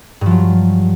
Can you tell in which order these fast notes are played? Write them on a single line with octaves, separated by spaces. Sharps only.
G2 F3 F#3